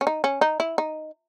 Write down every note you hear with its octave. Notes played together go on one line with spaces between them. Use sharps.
C#4
D#4
C#4
D#4
E4
D#4